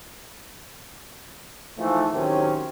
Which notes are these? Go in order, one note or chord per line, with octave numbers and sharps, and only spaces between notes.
G#2 E3 F3 A3
A2 C3 D#3 F#3 C4 C#4